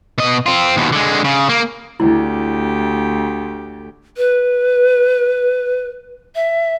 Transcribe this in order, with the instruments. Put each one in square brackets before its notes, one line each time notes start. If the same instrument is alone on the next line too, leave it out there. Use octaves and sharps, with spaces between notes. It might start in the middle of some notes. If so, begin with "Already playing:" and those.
[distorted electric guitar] B2 D#5
C4 F4
D#2 B2
D3 G#3
C#3
A#3
[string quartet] D2 G4 [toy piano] E4
[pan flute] B4
E5